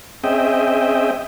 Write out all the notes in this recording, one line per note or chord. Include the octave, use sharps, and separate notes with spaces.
C4 C#4 G#4 D#5 E5 G5